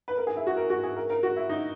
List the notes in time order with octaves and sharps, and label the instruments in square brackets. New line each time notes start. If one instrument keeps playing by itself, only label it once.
[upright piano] B4
A#4
G#4
E4
F#4
A#4
F#4
G#4
A#4
A#4
F#4
E4
D#4